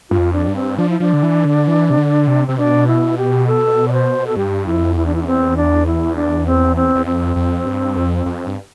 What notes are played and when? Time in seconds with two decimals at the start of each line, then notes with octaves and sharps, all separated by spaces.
0.10 G2 F4
0.18 F2
0.33 D4
0.48 G2
0.56 C4
0.78 F3 D4
0.90 E4
1.00 F3 D4
1.13 D3
1.23 E3
1.45 D3
1.67 E3
1.90 C3
1.97 D3
2.27 C3
2.47 C3 C4
2.57 B2 D4
2.87 E4
3.18 G4
3.47 A4
3.88 D5
3.93 C5
4.27 A4
4.37 G2 G4
4.66 F2 E4
4.96 E2 E4
5.06 D4
5.15 E4
5.22 D4
5.27 C4
5.57 D4
5.86 E4
6.16 D4
6.46 C4
6.76 C4
6.95 E2
7.06 F2 C4
7.36 F2
7.66 G2
7.96 F2
8.26 F2
8.47 G2